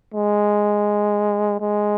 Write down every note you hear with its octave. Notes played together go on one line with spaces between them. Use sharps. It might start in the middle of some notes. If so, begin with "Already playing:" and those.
G#3
G#3